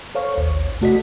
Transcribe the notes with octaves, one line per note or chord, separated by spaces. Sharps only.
A4 C5 C#5 F5 C#6
A1 D#2 C#5
C3 A3 F#4 D5 D#5 B6